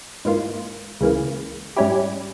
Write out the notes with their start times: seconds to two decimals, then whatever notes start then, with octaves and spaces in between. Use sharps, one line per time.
0.25 G#2 E3 A#3 F4
1.01 C#2 C#3 E3 A#3
1.76 G#2 G3 C#4 E4 G4